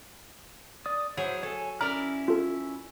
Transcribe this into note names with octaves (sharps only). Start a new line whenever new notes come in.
D5 D#6
F#3 E4 G#4 C5
A4 C#5 G#5
C#4 E4 A#4 D5 A#5 F6
F4 A4